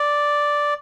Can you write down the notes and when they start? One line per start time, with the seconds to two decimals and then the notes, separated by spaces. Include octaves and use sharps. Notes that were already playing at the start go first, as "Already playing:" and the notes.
Already playing: D5